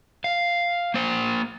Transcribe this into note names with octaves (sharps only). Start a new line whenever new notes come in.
F5
A#3 C5